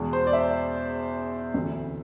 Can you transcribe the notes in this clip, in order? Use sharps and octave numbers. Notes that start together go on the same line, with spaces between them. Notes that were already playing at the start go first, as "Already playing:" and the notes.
Already playing: E2 B2 G#3
C5
D5
E5
D2 C3 E3 A3